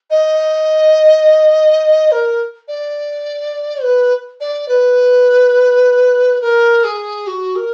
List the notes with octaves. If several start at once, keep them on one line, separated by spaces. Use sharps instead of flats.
D#5
A#4
D5
B4
D5
B4
A#4
G#4
F#4
A#4